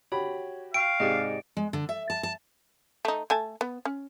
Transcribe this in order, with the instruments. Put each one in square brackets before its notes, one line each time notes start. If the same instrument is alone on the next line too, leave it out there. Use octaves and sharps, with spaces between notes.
[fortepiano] F#4 G4 B5 [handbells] C#5
[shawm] F5 [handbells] G5 C#6 [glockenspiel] D7
[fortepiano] G#2 C3 G#4 [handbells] G4 D5 D#5
[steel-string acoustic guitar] G#3
D3
E5
A5
A5
[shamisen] A3 D#4
A3 G#5 A5
B3
C#4